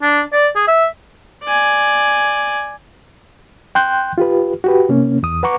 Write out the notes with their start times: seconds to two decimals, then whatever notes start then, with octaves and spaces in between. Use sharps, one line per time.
0.02 D4
0.33 D5
0.56 G#4
0.68 E5
1.44 D5 G#5
3.75 G5 C6 F#6 G6
4.18 F4 G4 B4
4.64 F#4 G4 B4
4.89 C3 A#3 C#4
5.23 E2 D#6
5.43 B4 F#5 A#5 C#6 D6